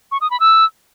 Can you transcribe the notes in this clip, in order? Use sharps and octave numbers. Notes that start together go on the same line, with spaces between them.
C#6
D#6
B5
E6